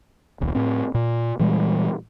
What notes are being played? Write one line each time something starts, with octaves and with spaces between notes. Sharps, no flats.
D1 A#1 D#2
A2 C4
A#2
A#2 E3 G3 G#3